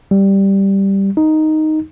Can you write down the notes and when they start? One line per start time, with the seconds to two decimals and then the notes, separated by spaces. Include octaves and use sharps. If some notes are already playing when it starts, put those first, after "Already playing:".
0.11 G3
1.17 D#4